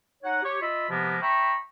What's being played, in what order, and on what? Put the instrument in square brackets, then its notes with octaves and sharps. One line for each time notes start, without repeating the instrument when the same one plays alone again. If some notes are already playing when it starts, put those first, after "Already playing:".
[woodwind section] D#4 C#5 F#5
G4 C#5
F4 D#5 E5 B5
C3 F3 G#3 A#3 B3
E5 G5 A#5 B5 C#6